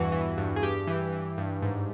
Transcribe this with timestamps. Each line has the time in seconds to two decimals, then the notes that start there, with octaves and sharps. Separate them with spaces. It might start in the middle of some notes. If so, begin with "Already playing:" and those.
Already playing: E2 G2 E3 F#4
0.12 E3
0.38 G2
0.56 G#4
0.63 G2 G4
0.87 E3
1.12 E3
1.38 G2
1.62 G#2